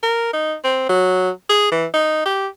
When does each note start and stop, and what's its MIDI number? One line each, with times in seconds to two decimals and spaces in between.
0.03 0.29 70
0.33 0.55 63
0.64 0.86 60
0.89 1.30 54
1.50 1.72 68
1.72 1.86 52
1.94 2.25 63
2.26 2.47 67